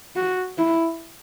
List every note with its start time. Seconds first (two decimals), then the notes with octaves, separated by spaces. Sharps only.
0.16 F#4
0.58 E4